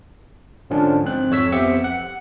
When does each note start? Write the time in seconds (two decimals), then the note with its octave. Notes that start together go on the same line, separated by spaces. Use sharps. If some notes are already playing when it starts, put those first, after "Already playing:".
0.70 G#2 D3 F3 C#4 D4
1.04 G#2 C4 F#6
1.31 F2 C#5 E6 B6
1.52 F2 B3 C4 G4 E5 C#7
1.84 F#5